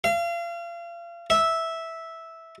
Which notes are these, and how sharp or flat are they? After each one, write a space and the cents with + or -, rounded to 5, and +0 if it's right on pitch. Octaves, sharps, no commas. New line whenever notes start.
F5 -35
E5 -10